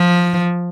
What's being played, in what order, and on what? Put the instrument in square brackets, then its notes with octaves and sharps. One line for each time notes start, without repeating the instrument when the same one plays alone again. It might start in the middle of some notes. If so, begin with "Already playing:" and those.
Already playing: [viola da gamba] F3